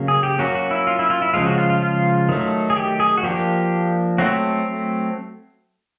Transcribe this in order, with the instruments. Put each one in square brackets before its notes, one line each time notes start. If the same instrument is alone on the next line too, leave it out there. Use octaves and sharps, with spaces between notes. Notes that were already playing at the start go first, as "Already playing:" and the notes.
Already playing: [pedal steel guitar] C#3 F#3 A#3
G#4
G4
F#3 A#3 C#4 F#4
F#4
E4
F4
E4
F4
E4
C#3 F3 G#3 F4
F#4
F4
F4
F4
D#3 F#3 A3
G#4
G4
G#4
F#4
F3 A#3 D4 G4
F#3 A3 C4 F#4